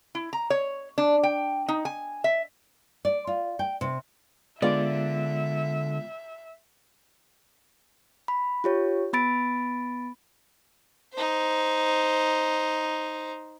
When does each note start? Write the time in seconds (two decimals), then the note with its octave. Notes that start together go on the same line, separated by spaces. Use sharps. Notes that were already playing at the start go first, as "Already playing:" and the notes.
0.15 E4
0.33 A#5
0.50 C#5
0.98 D4
1.23 G5
1.68 D#4
1.85 G#5
2.24 E5
3.05 D5
3.27 F4
3.59 G5
3.81 C3
4.62 D3 G#3 B3 F4 D5 E5
8.28 B5
8.64 F4 G4 C#5
9.13 B3 B5 A6 D7
11.14 D#4 C5